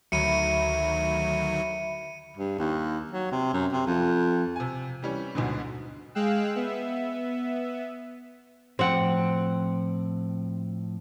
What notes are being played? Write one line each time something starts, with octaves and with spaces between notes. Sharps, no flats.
D2 D#3 F#3 E5 B5 C#7 D#7
G2
D#2
F#3
C3
F#2
C3
F2
C3 G#5
E3 G3 C#4
D2 G#2 B2 D3
G#3 G#4 F5 G5 E6 F#6
B3 E5
A2 F3 C4 F#5 G5